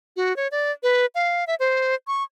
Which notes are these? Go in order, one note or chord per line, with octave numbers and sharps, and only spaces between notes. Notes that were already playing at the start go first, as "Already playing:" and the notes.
F#4
C#5
D5
B4
F5
E5
C5
C#6